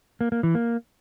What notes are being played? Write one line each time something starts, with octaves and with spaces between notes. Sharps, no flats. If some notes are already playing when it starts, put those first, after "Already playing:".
A#3
A#3
E3
A#3